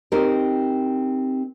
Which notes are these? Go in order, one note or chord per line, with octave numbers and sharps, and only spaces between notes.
C4 D#4 G4 A#4